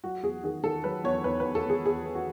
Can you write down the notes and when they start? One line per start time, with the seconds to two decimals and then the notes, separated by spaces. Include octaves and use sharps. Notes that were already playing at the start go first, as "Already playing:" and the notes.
0.04 F#3 F#4
0.23 E2 G#4
0.43 D#3 G#4
0.63 D#3 A4
0.84 F#3 B4
1.04 E2 C#5
1.24 E2 B4
1.40 B4
1.45 E2
1.55 A4
1.65 E2 G#4
1.85 E2 G#4
2.05 E2
2.15 F#4